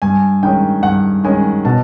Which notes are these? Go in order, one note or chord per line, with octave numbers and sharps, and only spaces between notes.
G2 G#5
D#3 G#3 C#4 G5
G2 F#5
D#3 G#3 C#4 G#5
B2 A5